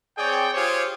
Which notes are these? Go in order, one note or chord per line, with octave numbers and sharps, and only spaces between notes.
C4 G#4 C#5 D5 G5
F4 G4 G#4 C5 C#5